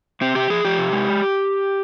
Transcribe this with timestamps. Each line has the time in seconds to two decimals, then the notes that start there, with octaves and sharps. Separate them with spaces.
0.21 C3 C4
0.35 C3 G4
0.50 F3 G#4
0.65 F3 G4
0.78 C3
0.93 G#3